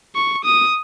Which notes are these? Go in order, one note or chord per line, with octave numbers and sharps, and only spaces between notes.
C#6
D#6